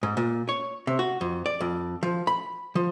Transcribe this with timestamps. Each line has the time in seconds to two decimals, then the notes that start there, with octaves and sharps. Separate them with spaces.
0.03 G#2
0.17 A#2
0.49 C#5
0.87 C3
0.99 F#4
1.21 F2
1.46 D5
1.61 F2
2.03 F3
2.27 B5
2.75 F3